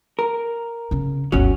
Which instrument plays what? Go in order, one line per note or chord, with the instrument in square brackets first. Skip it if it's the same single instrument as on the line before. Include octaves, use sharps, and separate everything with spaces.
[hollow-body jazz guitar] A#4
[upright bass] C#3 C#4
[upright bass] G1 D2 [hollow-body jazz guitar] F#3 C#4